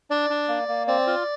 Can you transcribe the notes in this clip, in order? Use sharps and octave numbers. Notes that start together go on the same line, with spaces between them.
D4 D5
D4
A#3
A#3
C4 D5
F4